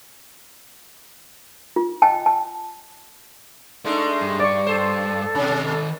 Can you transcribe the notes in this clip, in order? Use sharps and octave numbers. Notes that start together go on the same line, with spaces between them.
F4
D#5 G5 A5
A5
G#3 A3 D4 D#4 C6
G2
D5 C#6
A4 C5
B2 D#3 C#4 B5